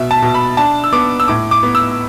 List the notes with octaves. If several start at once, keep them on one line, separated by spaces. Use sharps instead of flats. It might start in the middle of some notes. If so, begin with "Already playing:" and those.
Already playing: B2 E5
A5
B2
B5
D4 A5
E6
B3 D6
E6
A2 D6
D6
B3
E6